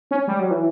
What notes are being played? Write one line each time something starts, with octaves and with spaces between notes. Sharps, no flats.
C#4
G3
F#3
E3